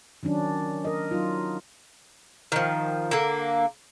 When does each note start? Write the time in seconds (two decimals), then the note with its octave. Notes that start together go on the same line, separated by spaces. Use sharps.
0.23 D#3 F#3 C#4 D4
0.85 A#4 D#5
1.11 F#3 D#4 F4
2.52 D#3 F3
3.11 D3 A#3